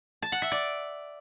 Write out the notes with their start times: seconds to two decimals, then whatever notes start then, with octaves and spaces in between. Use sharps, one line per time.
0.22 A5
0.32 F#5
0.42 E5
0.52 D5